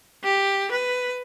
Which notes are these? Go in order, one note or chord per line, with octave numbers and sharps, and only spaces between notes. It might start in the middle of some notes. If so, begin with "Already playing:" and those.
G4
B4